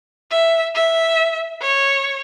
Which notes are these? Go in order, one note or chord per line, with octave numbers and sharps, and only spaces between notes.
E5
E5
C#5